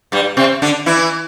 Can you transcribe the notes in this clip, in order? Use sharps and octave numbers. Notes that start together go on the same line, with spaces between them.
G2 G3
C3 C4
D3 D4
E3 E4